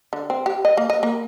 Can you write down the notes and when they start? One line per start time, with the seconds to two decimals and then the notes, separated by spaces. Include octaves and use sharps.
0.13 D3
0.30 C4
0.46 G4
0.65 D#5
0.77 A#3
0.90 D#5
1.03 A#3